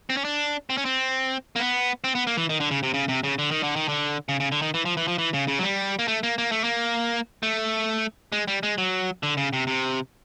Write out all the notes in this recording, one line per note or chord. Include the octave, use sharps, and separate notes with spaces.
C4
C#4
D4
C4
C#4
C4
A#3
B3
C4
B3
A#3
E3
D#3
D3
C#3
C3
C#3
C3
C#3
D3
D#3
D3
D#3
D3
C#3
C#3
D3
D#3
E3
F3
E3
F3
E3
C#3
C#3
F#3
G3
A#3
A3
A#3
A#3
A3
A#3
A3
G#3
G3
G#3
F#3
D3
C#3
C3
C3